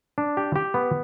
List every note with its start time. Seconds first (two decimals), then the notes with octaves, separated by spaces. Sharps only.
0.18 D4
0.37 G4
0.56 G4
0.74 B3